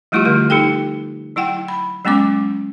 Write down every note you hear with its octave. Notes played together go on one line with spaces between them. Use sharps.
F3 G3 A3 E4 F4 G4
D3 G3 E4
D#4 G4 A4 G5
F#3 E4 F#5 G5
B5
F#3 G#3 B3 C#4 D6